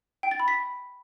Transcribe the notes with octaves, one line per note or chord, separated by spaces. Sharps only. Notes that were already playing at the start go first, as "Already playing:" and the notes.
G5
A6
B5
B6